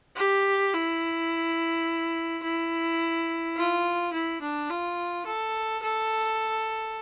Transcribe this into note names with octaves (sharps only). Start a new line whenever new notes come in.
G4
E4
E4
F4
E4
D4
F4
A4
A4